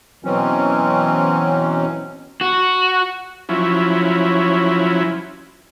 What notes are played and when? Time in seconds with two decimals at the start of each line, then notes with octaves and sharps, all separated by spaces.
0.24 B2 E3 F#3 C4 C#4
2.41 F#4
3.49 F3 F#3 C#4 E4